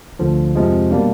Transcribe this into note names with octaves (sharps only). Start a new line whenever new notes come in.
D2 D3 F3
F2 C3 F3 G#3
B2 G3 A#3 D4